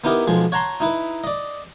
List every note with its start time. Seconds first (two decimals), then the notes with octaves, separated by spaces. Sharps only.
0.04 B3 D#4 E4 G4 A#4
0.27 B1 F3 G#3
0.52 C#5 F#5 A5 A#5 C6
0.80 D#4 E4 B4
1.24 D5 D#5